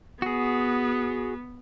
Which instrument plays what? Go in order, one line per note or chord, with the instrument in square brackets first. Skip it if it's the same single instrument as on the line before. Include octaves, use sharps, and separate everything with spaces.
[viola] B3 [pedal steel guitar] F#4 G#4